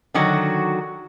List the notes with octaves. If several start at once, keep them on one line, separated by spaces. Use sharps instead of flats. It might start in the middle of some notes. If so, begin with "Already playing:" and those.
D3 D#3 F#3 F#4